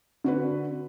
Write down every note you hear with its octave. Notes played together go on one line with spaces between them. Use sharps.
D3 F#4 B4